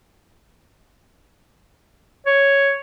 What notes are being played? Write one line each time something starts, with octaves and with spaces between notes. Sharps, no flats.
C#5